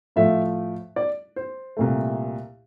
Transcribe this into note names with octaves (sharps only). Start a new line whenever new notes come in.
A2 F3 A3 E5
D5
C5
C2 A#2 A3